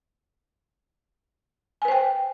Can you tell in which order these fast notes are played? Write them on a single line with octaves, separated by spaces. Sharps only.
G#5 B4 C5 G5